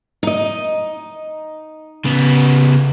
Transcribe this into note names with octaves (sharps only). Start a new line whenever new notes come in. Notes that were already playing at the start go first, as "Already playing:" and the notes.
D#4 D#5
C#3 B3